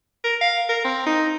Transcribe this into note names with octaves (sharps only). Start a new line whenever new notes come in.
A#4
F5
A#4
C4
D#4